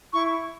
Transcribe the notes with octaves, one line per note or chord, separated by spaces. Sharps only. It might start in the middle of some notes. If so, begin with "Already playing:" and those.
E4 C#6